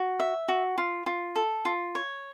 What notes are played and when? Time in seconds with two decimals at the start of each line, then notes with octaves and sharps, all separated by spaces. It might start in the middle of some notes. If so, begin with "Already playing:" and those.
Already playing: F#4
0.20 E5
0.48 F#4
0.78 F4
1.06 F4
1.36 A4
1.65 F4
1.95 C#5